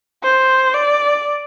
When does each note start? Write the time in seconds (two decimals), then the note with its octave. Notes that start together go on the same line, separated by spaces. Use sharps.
0.24 C5
0.74 D5